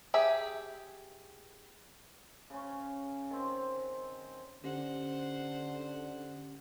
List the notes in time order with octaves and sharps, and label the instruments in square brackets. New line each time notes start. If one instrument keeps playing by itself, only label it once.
[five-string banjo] G4 G#4 E5
[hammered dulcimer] C#3 C#4
D#3 C4
[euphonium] D3 [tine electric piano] C#4 G4 [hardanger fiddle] C5 F#5